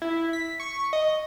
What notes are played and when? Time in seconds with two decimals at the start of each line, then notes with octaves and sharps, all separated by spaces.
0.02 E4
0.33 B6
0.60 C#6
0.93 D#5